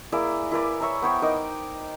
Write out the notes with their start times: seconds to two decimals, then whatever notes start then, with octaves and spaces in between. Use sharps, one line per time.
0.12 A#3 E4 G#4 D5
0.51 E4 A#4 B4 D5
0.81 C#5 E5 A#5
1.02 B3 C5 C#5 G5
1.22 D#4 A#4 D6